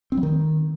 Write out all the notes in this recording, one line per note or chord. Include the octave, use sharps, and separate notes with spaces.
C4
G3
D#3